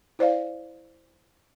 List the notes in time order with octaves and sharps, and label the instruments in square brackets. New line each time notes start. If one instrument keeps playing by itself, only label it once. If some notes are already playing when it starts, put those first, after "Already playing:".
[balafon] E4 C5 D5 F5